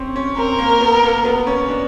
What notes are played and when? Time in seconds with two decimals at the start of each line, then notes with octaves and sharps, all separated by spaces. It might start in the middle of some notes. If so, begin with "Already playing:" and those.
Already playing: C4 C#4
0.16 C#4
0.37 C4 A#4
0.59 A#3
0.81 B3
1.03 A#3
1.25 B3
1.47 C#4
1.68 D4